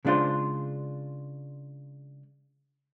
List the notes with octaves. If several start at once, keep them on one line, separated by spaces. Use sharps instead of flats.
C#3 G#3 D4 F4 C5